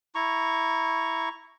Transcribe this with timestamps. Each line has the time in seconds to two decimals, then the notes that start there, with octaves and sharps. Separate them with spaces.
0.15 E4 A#5 C#6